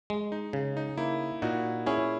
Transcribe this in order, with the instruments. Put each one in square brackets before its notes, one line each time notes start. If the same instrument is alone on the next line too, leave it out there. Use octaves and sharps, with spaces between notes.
[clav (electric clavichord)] G#3
[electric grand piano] D#4
[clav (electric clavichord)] C#3
[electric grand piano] D#4
[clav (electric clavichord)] A#3 [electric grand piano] E4
[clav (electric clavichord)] A#2 [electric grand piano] D#4 F#4
[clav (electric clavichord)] C#4 [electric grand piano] E4 G#4